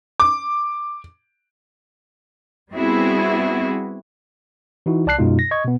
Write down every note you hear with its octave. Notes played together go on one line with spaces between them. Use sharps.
D6
G3 B3 C4 E4 F#4 G#4
E3 D#4 E4 F#4
C2 D5 A5 F#6 C7
F#2 B2 G#3 D#4 F4
A#6
D#5 C#6 G#6
B2 B3